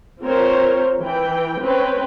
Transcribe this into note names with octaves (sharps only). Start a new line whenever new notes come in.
C4 F4 A#4 C5 C#5
E3 G5
C4 C#4 B4 C#5 G5